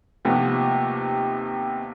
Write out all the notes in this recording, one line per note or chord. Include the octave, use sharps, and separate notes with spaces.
D#2 C3 F3 A3 B3